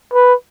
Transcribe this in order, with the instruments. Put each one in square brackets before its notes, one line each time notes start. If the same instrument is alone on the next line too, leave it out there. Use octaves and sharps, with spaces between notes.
[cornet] B4